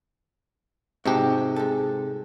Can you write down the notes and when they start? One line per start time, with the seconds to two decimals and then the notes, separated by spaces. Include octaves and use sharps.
1.06 G#2 C3 F#4 G4 A5 A#5
1.56 G#3 A4